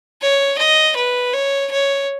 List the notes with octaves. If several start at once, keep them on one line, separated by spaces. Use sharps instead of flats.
C#5
D#5
B4
C#5
C#5